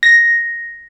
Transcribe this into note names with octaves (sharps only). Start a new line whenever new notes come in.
A#6